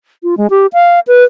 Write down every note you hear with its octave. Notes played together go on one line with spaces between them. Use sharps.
F4
G#3
G4
F5
B4